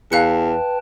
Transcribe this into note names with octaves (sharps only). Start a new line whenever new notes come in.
E2 B4 F5 G5 A5 F#6 C#7